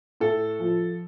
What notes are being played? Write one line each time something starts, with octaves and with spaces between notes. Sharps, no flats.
A2 A4
F3